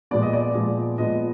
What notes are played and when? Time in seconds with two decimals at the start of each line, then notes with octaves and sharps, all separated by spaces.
0.11 A#2 F3 G#3 B3 D5
0.22 D#5
0.33 D5
0.55 A#2 F3 G#3 B3
0.98 A#2 F3 G#3 B3 D#5